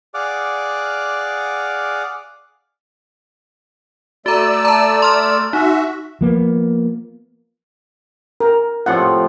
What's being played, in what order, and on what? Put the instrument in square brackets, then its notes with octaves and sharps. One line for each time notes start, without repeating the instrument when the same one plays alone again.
[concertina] G#4 D5 F5 F#5 D6
[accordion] A3 D5 E6 [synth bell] F#4 A#5
[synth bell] A5 A#5
C6 F6
[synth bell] D#4 [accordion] F#4 E5
[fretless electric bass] F3 A#3 B3
[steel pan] A#4
[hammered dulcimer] A2 C3 F3 [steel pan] F#5